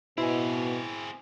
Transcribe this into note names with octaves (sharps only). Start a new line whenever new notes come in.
B2 C4 E4 G#4